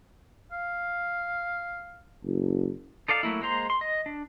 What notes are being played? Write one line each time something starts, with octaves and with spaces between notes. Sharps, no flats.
F5
F#1
D#4 A4 D5 F5 A5
F#3 A3 A#3 E4
G#3 A#3 C5 A#5 C6
C6
D#5
D4